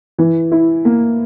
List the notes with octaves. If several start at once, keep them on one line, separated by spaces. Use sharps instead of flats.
E3
E4
A#3